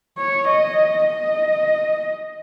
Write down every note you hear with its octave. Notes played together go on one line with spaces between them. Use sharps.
C#5
D#5
D#5